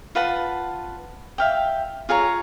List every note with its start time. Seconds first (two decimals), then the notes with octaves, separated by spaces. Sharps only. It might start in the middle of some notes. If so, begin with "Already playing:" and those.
0.15 F4 B4 F#5 A5
1.38 E5 F5 G5
2.09 F4 G#4 C#5 A#5